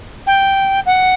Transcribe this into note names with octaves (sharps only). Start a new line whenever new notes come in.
G5
F#5